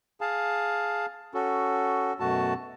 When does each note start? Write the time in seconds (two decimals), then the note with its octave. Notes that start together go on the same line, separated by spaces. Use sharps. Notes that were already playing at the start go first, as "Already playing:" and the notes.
0.21 G#4 F5 A5
1.34 C#4 F#4 A4
2.20 F#2 B2 A3 F#4 A5